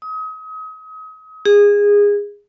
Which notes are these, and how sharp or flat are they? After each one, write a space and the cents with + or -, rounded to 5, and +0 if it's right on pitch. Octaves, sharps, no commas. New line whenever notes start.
D#6 +35
G#4 -20